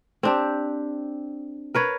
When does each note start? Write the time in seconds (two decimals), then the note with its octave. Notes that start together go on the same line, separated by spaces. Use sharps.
0.23 C4 D4 G4
1.75 A#4 B4 C#5